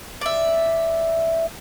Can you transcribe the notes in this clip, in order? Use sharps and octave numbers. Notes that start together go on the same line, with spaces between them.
D5 E5